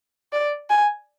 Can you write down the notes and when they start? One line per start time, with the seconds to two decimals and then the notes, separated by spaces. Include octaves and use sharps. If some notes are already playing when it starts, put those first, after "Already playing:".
0.33 D5
0.70 G#5